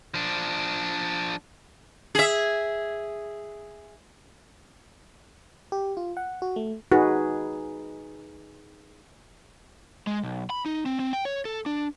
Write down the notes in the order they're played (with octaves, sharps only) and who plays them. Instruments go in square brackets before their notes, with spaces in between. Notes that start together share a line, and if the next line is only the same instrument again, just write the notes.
[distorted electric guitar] F3 D4
[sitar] G#4 E5
[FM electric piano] G4
F4
F#5
F#4
A3
[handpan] D#4 G#4 B4 [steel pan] F#4
[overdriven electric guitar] G#3
B1
B5
D#4
C4
C4
G5
C#5
A4
D4